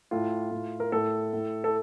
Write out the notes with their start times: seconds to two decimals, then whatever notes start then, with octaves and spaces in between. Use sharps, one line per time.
0.11 A2 F4
0.51 A2
0.80 A#4
0.92 A2 A4
1.33 A2
1.64 A4